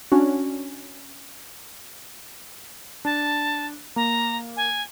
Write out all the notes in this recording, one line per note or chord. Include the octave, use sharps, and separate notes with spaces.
C#4 D4 F#4
D4 A5
A#3 A#5
G#5